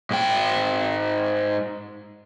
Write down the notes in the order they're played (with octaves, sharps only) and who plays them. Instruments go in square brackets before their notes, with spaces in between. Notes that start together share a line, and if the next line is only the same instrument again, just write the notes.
[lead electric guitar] G#2 G5